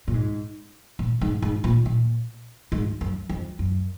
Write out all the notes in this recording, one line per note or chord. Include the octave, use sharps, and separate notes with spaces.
A#2
G#2
A#2
G#2
G#2
A#2
A#2
G#2
F#2
F2
F#2